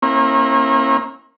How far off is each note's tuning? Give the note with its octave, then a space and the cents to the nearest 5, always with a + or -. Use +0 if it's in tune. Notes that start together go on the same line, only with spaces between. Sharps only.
A#3 +0 C#4 -45 E4 -15